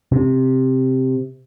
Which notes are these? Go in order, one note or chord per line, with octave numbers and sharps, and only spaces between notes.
C3